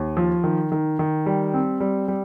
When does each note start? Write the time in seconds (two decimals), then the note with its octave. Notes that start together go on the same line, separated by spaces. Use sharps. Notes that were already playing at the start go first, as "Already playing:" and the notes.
Already playing: D#2
0.17 F3
0.44 D#3
0.72 D#3
0.99 D#3
1.26 G3
1.54 C4
1.80 G3
2.08 G3